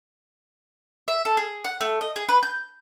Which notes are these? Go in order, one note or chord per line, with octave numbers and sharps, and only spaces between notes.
E5
A4
G#4
F#5
A3
D#5
G#4
B4
G6